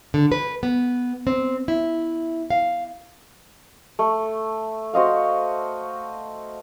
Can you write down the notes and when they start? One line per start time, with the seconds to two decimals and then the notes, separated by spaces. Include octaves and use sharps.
0.14 D3
0.32 B4
0.63 B3
1.27 C4
1.68 E4
2.50 F5
3.99 A3
4.94 F#4 C5 D#5 F5